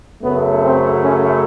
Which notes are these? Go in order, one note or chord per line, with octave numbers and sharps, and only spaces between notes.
F#2 C#3 F#3 A3 B3
C4
C#4